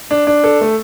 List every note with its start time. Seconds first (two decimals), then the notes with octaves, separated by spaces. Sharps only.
0.11 D4
0.27 D4
0.44 A4
0.61 A3